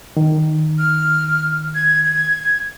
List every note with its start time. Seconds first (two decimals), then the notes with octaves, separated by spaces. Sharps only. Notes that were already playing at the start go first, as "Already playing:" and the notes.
0.17 D#3
0.78 F6
1.75 G#6
2.05 G#6